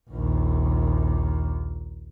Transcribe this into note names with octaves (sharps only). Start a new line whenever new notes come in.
A#1 D#2